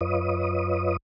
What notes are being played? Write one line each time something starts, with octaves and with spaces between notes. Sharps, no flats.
F#2 F4 B4 C#5 D#5 D#6